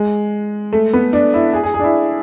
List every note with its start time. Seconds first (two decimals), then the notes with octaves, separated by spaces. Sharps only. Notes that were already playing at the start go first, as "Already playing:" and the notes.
Already playing: G#3
0.73 A3
0.93 B3
1.13 D4
1.34 E4
1.53 G#4
1.63 G#4
1.74 G#4
1.79 D4
1.84 E4